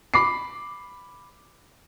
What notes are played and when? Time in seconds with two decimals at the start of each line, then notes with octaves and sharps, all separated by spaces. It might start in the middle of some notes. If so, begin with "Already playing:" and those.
0.14 B5 D6 C7